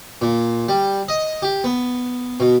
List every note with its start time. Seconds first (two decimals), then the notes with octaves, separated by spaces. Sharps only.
0.22 A#2
0.68 G3
1.08 D#5
1.42 G4
1.64 B3
2.40 B2